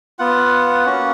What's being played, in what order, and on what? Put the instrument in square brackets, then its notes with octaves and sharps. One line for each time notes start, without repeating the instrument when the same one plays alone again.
[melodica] B3 F4 F#5
A#3 C#4 F#4